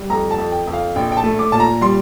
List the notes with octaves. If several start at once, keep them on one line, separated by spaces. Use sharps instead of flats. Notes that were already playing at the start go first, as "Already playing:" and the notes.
Already playing: G3
F2 A#5
A5
F2
G5
F2
F5
A#1 G5
G5
A5
A3
D6
A#2 A5
A#5
G3 C6